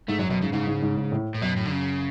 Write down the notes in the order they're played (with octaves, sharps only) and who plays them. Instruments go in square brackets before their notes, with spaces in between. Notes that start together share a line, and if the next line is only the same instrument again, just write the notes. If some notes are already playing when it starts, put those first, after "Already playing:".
[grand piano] G#2 [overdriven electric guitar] A3
[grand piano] F#2 [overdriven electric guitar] F#3
[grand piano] F#2 [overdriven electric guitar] B2
[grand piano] G#2 [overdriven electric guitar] C#3
[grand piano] G#2 [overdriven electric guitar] C#3
[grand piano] G#2
G#2
G#2
A2
[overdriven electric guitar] A2
[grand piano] F#2 [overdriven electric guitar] B2
[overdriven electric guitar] A2
D3
C#3